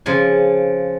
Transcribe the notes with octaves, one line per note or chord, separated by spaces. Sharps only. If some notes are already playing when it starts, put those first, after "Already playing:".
C#3 F3 G#5